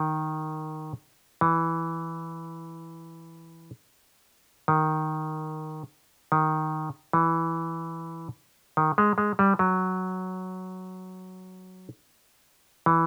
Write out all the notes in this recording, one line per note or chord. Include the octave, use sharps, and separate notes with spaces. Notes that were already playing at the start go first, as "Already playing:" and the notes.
Already playing: D#3
E3
D#3
D#3
E3
D#3
G#3
G#3
G3
F#3
E3